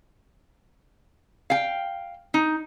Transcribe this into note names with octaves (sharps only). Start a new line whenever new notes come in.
F5 G5
D#4